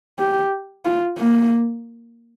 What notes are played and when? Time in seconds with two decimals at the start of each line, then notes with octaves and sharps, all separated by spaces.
0.19 G4
0.85 F4
1.18 A#3